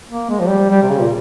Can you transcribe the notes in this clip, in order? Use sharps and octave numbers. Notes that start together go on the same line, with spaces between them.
A#3
G#3
F3
G3
G3
C3
C#3
A#2